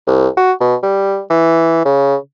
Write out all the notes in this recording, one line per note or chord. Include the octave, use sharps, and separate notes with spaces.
C2
F#4
B2
G3
E3
C#3